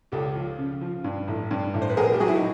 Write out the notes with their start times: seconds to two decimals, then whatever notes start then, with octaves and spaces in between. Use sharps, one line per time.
0.12 C#2 G4 A4
0.35 F3
0.58 C#3
0.81 F3
1.04 G2
1.28 A1
1.51 G2
1.74 A1
1.82 C5
1.89 B4
1.97 A#1 G#4 A#4
2.13 G4
2.20 F#3 F#4 G#4
2.28 E4
2.36 D#4